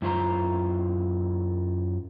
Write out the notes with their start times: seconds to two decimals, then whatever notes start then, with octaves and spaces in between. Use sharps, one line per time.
0.02 F#2 E4 F4 C5 A#5